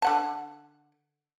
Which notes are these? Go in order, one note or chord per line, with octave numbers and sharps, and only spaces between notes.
D3 F#5 A5